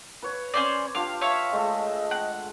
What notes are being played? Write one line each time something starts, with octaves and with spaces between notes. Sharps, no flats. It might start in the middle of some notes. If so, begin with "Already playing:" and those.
B4 C#5
C#4 C5 D5
D4 F4 G4 F5
C#5 E5 F5
G#3 A3 D#5
F#5